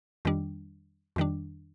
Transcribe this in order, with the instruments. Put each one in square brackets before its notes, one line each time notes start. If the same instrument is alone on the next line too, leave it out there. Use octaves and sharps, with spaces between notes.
[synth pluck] F2 D#3 G3 D4
F2 D#3 G3 D4